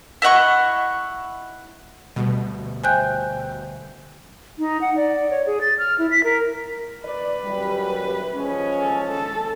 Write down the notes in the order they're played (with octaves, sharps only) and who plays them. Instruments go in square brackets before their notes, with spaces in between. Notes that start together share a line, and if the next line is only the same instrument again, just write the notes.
[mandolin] E4 D#5 F#5 C#6
[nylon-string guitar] D2 G3 [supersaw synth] B2
[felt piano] C5 E5 G5 [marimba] G#5 F#6 G6
[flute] D#4
F#5
D5
C#5
G#4
A6
F6
E4
B6
A#4
[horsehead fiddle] B4 [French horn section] D5
[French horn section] F#2 G3
F3 G#3 C#4
[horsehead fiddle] A4
A4